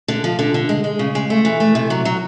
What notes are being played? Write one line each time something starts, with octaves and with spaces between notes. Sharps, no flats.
D3
F3
D3
D3
G#3
G#3
C#3
G#3
A3
E3
A3
C3
F#3
F#3